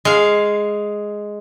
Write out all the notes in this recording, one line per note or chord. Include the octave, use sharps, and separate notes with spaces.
G#3 F5